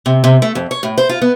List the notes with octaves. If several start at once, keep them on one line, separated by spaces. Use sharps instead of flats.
C3
C3
A3
F2
C#5
A2
C5
F4
B3